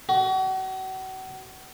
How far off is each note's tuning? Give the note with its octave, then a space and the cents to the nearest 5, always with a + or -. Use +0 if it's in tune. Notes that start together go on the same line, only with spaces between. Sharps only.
F#4 +35